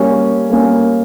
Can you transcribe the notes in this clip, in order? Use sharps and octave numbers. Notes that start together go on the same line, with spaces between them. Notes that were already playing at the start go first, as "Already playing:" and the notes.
Already playing: G3 A#3 C#4
G3 A#3 C#4